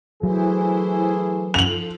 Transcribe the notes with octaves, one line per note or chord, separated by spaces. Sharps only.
E3 F#3 A3 E4 G#4 C5
F3 F4 A4 F7 F#7